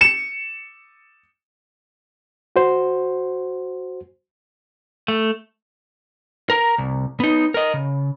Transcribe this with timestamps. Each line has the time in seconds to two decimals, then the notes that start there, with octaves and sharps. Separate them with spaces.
0.01 C#7 E7
2.56 F#4 C5
5.08 A3
6.50 A#4 A#5
6.78 C2
7.20 B3 D#4
7.54 A#4 D#5
7.74 C#3